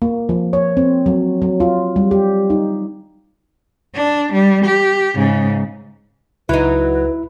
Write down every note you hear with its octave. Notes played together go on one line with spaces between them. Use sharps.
A#3
F3
C#5
C4
F#3
F#3
F4
G3
G4
D#4
D4
G3
G4
G#2 C#3
C#2 F#3 D#4 E4 B4